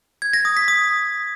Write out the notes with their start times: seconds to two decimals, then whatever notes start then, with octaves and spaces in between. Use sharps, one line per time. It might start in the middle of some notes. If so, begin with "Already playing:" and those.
0.22 G#6
0.33 A#6
0.45 D#6
0.57 B6
0.68 D#6